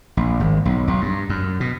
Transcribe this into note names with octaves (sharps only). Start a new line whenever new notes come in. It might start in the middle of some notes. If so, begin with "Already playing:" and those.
A#1
G#1
B1
B1
G2
F#2
B2